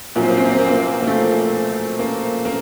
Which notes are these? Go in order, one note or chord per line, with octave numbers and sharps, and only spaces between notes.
A#1 A#2 F#3 A#3
C4
A#3
C4
A#3
C4
A#3
C4
A#3
A#3
A3
A#3
A#3